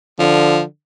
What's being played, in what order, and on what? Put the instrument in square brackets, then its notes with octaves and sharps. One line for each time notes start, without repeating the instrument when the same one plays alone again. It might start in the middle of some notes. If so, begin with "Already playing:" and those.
[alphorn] D3 [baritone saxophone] F3